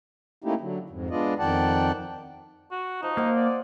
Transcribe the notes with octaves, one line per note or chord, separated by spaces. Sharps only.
A3 A#3 C#4 D#4 E4 G4
D3 F#3
F2 G#2
G#3 B3 D4 F4 D5 D#5
F2 D#3 D5 F#5 G5 A5
F#4
F3 D#4
A#3 C5 D#5 F#5
D5